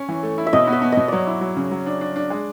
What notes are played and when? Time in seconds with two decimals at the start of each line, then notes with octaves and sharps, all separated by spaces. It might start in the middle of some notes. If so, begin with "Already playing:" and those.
Already playing: C#4 C#5
0.09 E3
0.23 A3
0.38 E4
0.46 E5
0.53 B2 D#5
0.67 B3
0.73 E5
0.82 B3
0.92 B2 D#5
1.08 F#3 C#5 D5
1.27 E4
1.41 F#3
1.56 C#3
1.71 F#3
1.86 D4
2.01 D4
2.16 D4
2.30 G#3